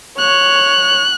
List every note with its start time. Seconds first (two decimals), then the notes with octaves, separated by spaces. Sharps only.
0.19 C#5 F#6